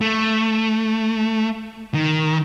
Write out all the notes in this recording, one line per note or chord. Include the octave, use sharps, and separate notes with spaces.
A3
D#3